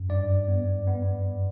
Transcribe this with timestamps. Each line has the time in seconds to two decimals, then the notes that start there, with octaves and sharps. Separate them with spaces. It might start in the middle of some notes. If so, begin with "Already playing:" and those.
Already playing: F#2
0.09 G2 D5
0.48 B3
0.87 B3